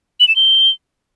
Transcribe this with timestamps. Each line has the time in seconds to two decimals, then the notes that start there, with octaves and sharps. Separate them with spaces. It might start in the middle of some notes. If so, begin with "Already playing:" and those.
0.20 F#7
0.28 E7
0.36 G7